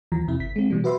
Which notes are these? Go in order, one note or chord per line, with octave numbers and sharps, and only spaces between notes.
D#2 E3 F3 A#5
E2 C3 E4
G1 B6
G#3 C4
B2 E3 G3
F#4 B4 E5 C6